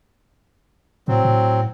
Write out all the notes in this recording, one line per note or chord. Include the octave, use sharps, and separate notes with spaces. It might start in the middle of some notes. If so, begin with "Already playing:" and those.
A2 F#3 C4
A2